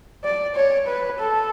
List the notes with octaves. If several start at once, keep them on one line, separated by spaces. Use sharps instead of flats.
D5
C#5
B4
A4